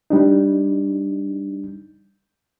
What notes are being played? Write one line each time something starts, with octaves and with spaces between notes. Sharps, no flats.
G3 D4 D#4